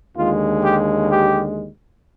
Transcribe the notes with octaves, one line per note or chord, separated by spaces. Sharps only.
D#2 D3 G#3 F4
G4
G4